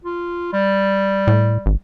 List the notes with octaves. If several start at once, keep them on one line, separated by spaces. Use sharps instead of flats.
F4
G3
A2
G#1